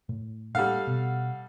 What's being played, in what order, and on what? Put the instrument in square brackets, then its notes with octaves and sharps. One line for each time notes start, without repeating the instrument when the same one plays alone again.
[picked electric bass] A2
[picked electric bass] A2 A#3 D4 [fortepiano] G3 A4 F5 [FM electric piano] F#5
[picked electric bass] B2